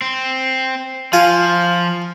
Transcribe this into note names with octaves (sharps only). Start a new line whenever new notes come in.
C4
F3 F4 G#5